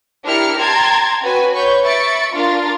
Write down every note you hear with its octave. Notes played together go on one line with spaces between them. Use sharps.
D4 E4 G4 A#4 F6 C#7
G5 A5 A#5 C6 G#6 A6
C#4 F#4 B4 G5 G#5
B4 C#5 C#6 G6
E5 B5 C#6 A6 C#7 D7
D4 F4 A#4 F5 A6